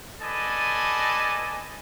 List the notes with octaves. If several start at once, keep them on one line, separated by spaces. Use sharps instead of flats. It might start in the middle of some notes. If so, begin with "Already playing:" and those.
A4 B4 D5 D#5 G#5 A5